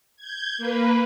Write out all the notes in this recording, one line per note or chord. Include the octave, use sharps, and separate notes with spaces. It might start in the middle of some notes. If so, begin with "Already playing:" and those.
G6 G#6
A#3 B4